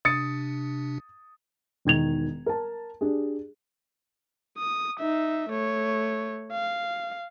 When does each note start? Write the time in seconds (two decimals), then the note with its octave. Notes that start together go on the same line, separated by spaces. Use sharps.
0.05 C3 D4 D#6 A6 C#7
1.85 E1 D#3 G#6 F7
2.46 A#4 A5
3.01 D4 G4 G#4
4.58 D#6
5.00 D#4 E5
5.49 A3 C#5
6.52 F5